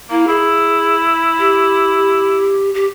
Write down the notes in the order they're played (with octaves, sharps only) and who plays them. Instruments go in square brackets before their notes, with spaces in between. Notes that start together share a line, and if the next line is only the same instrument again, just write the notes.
[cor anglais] A#3 [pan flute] E4
[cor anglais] E4 [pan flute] G#4
[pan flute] G4
G4